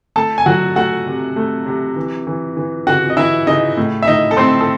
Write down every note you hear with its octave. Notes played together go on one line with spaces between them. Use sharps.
A3 A4 A5
G#5
F#3 F#4 F#5
A3 F#4 F#5
C3
A3
C3
E3
E3
E3
C#3 F#4 F#5
D#5
E3 E4 E5
C#3 D#4 D#5
A2
E5
A2 D#4 D#5
A4
A2 C4 C5
A4